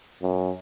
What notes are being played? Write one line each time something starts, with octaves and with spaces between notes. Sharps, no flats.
F#2